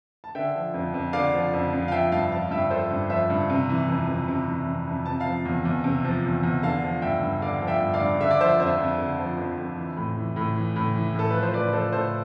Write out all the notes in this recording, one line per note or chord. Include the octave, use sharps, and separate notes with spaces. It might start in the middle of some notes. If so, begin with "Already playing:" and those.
A5
D3 E5 G5
F3
F2
F2
D3 D5 F5
F3
F2
F2
F5
F3 E5 G5
G2 F5 A5
F3 F5 A5
F5
G2 E5 G5
F3 A4 C5
G2
F3 C5 E5
G2
C3
E3
F2
F2
C3
E3
F2
F2
C3 A5
F5 A5
F3
E2
E2
C3
F3
E2
E2
D3 F5 A5
F3
G2 E5 G5
G2
D3 D5 F5
F3
E5 G5
G2
D5 F5
G2
D3 E5
D5
F3 C5 E5
F2 C5 E5
F2
D3
F3
F2
F2
E3
A2
E3
A2
E3
A2
E3
A2 A4
F3 B4
C5
A2 B4 D5
F3 A4 C5
A2 A4 C5